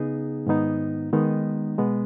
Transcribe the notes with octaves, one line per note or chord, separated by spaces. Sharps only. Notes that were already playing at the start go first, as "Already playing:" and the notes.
Already playing: C#3 B3 D#4 G#4
G#2 D#3 B3 D#4
D#3 G#3 B3 D#4
B2 G#3 B3